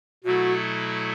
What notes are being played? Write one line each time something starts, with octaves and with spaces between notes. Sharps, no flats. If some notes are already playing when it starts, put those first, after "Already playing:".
B2 F#3 A3 E4 F#4 A4